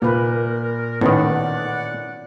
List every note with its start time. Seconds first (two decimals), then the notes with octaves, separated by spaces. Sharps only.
0.02 A#2 A#3 A#4 B4
1.01 A2 D#3 B3 C#4 D5 F#5